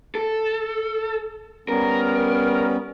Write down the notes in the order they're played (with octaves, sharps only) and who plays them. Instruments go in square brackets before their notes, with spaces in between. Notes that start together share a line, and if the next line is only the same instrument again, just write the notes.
[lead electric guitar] A4
[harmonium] G3 B3 C#4 [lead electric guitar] A#4